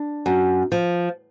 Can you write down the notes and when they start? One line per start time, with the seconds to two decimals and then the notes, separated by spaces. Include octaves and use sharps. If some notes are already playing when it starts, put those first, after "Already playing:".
Already playing: D4
0.26 F#2
0.72 F3